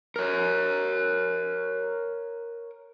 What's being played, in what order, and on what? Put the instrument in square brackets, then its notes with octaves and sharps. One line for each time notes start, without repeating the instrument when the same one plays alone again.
[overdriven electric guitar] A#4 C#5